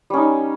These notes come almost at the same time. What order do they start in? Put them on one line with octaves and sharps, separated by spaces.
G3 C#4 D#4